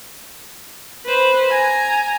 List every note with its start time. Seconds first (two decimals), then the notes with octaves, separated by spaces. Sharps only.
1.06 B4 C5
1.50 G#5 A#5